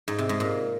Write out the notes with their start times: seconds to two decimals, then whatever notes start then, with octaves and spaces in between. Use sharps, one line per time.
0.08 G#2
0.19 C3
0.29 G#2
0.40 A#2